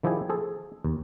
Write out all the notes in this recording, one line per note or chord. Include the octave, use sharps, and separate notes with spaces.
D#3 F3 E4 G4 G#4 G#5
G#4 A4 C5
D#2